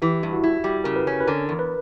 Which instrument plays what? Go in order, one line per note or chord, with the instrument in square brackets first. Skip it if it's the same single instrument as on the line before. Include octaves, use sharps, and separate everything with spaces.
[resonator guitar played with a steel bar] E3 [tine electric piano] G4
[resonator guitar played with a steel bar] G2 [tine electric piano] E4
[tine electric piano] F#4
[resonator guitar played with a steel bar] E4
[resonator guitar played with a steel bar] G3 [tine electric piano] G4
[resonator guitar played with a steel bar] C#3 [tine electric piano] A#4
[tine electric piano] B4
[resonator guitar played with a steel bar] C#4
[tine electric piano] B4
[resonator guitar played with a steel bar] D3 [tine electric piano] A#4
[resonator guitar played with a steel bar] E2
[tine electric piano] B4